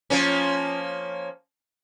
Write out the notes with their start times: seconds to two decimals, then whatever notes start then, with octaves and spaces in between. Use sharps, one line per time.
0.10 F3 A#3 C#4